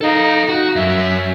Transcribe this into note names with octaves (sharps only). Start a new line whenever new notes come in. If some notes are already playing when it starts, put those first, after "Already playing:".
D#4 A4 F5
F#4
F#2 E5